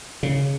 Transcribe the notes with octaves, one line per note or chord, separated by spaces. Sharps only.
C#3